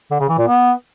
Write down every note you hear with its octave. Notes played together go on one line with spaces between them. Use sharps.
D3
C#3
E3
A#2
B3